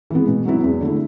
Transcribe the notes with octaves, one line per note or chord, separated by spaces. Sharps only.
E3 G#3 B3
B2
F#3 B3 E4
E2
D3 A3 E4